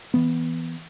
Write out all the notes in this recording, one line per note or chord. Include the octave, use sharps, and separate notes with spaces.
E3 B3